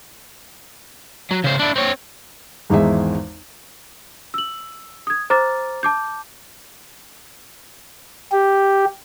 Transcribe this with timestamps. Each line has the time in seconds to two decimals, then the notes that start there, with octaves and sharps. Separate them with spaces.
1.31 F#3
1.44 C#3 C5
1.60 D4 E4
1.76 C4 C#5
2.70 G#1 E2 G#3 E5
4.34 E6 F#7
5.07 D#6 G#6
5.30 C5 A#5 D6 F6 A6
5.83 A5 D6 G6
8.32 G4